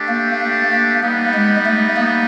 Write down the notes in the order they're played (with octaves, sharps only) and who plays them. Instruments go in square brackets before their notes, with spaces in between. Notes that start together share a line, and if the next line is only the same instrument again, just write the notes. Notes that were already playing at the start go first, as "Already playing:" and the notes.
Already playing: [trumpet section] A3 D4 G4
[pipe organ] A#3
A#3
A#3
[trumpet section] G3 B3 D#4 [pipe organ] A#3
[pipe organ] G#3
A3
A#3